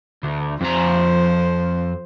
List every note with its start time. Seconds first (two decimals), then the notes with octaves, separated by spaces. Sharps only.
0.23 D2
0.61 F2 F3 C5 A#5